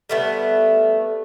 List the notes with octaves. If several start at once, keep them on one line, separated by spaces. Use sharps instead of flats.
G3 A3 B3